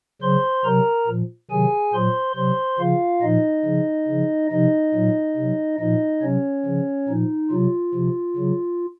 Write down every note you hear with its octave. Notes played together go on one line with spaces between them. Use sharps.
C#3 F#3 C5 C6
C3 F#3 A#4 A#5
A#2 F3
C3 D#3 F#3 G#4 G#5
A#2 F#3 C5 C6
C3 F#3 C5 C6
C#3 F3 F4 F5
A#2 F3 D#4 D#5
C#3 F3
C#3 F3
C3 F3 D#4 D#5
A#2 F#3
C3
F#3
A#2 F3 D#4 D#5
C3 F#3 C#4 C#5
C#3 F3
A#2 F3 D#4
C3 F#3 F4
C3 F3
C#3 F#3